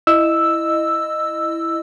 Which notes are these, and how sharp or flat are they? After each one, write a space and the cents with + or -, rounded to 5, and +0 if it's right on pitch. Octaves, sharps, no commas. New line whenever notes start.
E4 +5 D#5 -15 E6 +0